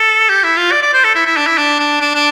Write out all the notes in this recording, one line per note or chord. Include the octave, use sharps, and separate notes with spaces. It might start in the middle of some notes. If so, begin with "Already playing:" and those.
Already playing: A4
G4
E4
F4
D5
D5
C5
A4
E4
E4
D4
E4
D4
D4
D4
D4